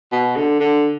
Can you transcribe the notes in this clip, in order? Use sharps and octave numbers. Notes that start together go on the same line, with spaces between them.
B2
D3
D3